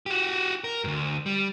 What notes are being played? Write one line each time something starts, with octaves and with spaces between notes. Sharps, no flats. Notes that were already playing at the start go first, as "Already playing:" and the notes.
F#4 G4
A#4
D2 G2
G3